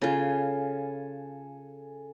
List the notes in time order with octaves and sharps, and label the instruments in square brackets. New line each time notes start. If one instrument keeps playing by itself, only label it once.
[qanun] C#3 F4 [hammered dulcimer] A4 G#5